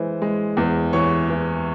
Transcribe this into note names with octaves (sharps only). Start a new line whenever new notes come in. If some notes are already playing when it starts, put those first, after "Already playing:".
Already playing: E3 G#3 C5
G#3
E2
E3 C#5 C#6
E3